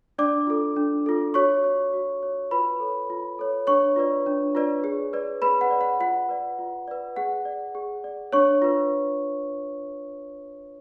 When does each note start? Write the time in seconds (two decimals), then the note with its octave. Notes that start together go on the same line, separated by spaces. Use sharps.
0.18 D4 D5 D6
0.47 F4 A4
0.76 D4
1.06 F4 A4
1.34 F#4 C#5 C#6
1.64 C#5
1.93 F#4
2.23 C#5
2.51 F4 B4 B5
2.80 A4 C#5
3.10 F4
3.39 A4 C#5
3.67 D4 C#5 C#6
3.96 F4 B4 D5
4.26 D4
4.55 F4 B4 D5
4.84 G#4
5.13 B4 D5
5.42 G#4 B4 B5
5.61 F#5
5.71 B4 D5
5.81 F#5
6.00 F4 F#5
6.29 B4 D5
6.59 F4
6.88 B4 D5
7.16 G#4 F#5
7.45 D5
7.75 G#4
8.04 D5
8.33 D4 C#5 C#6
8.62 F4 B4